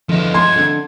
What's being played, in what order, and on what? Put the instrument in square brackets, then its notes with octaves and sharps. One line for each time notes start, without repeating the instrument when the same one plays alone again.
[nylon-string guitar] E2 D3 [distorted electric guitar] F3 D#5
[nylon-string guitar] G#5 [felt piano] C6 [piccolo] G#6
[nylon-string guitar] D3 D4